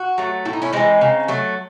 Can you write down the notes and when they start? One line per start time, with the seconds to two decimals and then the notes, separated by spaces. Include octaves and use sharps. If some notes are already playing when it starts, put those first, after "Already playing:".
Already playing: F#4
0.18 F#3 A3
0.46 A2 E4
0.53 D#4
0.62 C#4 E4
0.73 E3 G#3 C4 D#4
1.01 C#3
1.28 F#3 A3